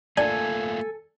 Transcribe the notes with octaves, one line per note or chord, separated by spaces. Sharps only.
A3 A#3 D4 F4 A4 G#5